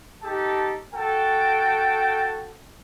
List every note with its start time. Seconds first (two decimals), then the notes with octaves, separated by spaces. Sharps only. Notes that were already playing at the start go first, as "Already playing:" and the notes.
0.23 D#4 G4 A4 A5
0.93 F#4 A4 G5